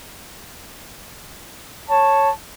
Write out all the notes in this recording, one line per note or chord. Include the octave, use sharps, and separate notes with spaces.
C#5 A5